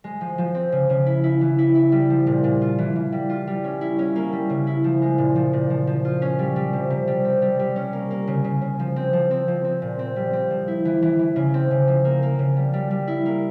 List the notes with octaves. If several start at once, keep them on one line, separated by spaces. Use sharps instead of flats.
G#3
F3
F3
C4
C#3
C#3
E4
E4
E3
E4
E4
G3
F3
A#2
A#2
F4
E3
E3
G3
F4
G3
C#4
E4
C#4
A#3
G3
C#3
E4
F3
G#3
A#2
F3
A#2
F3
F3
F4
C#4
G3
G3
C3
C3
G3
C4
G3
G3
C#4
A#3
A#3
C#3
C#3
C#3
F3
C4
F3
C4
F3
C4
A#2
C4
G3
C4
F3
E4
E3
E3
E3
C#3
C4
C#3
F3
A#3
A#3
C#3
G3
G3
G3
E4
A#3